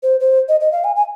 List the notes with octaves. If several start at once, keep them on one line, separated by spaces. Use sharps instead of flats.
C5
C5
D#5
D#5
F5
G#5
G#5